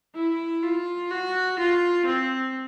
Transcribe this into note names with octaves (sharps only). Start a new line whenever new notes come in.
E4
F4
F#4
F4
C4